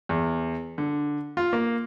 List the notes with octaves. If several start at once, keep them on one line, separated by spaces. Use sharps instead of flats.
E2
D3
F4
A#3